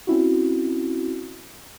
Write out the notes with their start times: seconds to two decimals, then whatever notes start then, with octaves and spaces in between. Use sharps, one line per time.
0.07 C4 C#4 E4 F#4